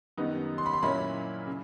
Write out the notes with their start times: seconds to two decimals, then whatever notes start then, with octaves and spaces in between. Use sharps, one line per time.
0.17 F#2 D#3 G3 B3 D#4
0.58 C6
0.66 B5
0.73 C6
0.82 A#2 F#3 A#3 C#4 E4 B5
1.47 C#3